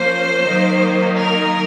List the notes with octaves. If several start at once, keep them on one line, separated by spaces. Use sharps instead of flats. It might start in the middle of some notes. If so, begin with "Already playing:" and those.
Already playing: F3 A#3 C#4 C5
D#3 F#3 A#3 D#4
A#4